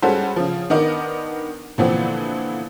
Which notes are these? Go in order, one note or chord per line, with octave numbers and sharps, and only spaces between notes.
G3 G#3 C#4 F#4 A4 C5
C#3 F3
D#3 B3 D4 A#4 D#5 D6
A#2 D3 E3 F3 B3 C4